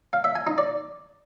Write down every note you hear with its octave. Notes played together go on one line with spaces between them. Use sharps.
F5
E5
G#5
D#4
D5